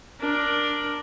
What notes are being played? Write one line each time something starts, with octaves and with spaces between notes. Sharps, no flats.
D4 A#4